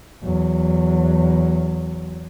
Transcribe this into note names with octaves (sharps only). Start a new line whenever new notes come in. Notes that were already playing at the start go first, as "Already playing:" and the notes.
E2 F#3